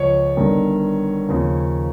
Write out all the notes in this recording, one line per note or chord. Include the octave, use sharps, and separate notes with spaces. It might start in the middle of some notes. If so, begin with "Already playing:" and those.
Already playing: C#2 C#3 F3 C#5
G1 G2 D#3
D#2 C#3 F3